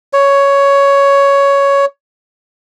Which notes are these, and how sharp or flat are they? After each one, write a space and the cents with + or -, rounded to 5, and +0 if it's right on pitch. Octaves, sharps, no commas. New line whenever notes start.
C#5 +10